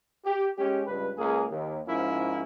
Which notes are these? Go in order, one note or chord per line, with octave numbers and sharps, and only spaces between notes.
G4
G#3 C#4 G4
C#2 G2 B4
C#2 A#3 G#4
D#2
G#2 F3 A#3 C#4 E4